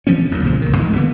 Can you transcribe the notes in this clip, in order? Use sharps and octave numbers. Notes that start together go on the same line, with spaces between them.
E3 F3 C4 C#4
A1 D#2 A#2 F#3
C2 A#2 C#3 F3
C#2 D#3
A1 G#2 F3 G#3
D3 E3 A#3 B3